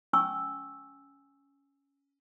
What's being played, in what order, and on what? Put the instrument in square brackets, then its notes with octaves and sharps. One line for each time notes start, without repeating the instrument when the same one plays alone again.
[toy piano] C#4 G#5 C#6 E6